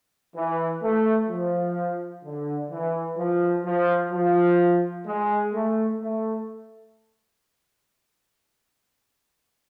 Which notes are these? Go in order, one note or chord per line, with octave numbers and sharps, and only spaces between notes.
E3
A3
F3
D3
E3
F3
F3
F3
G#3
A3
A3